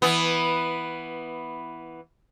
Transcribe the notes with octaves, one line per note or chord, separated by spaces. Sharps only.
E3 B3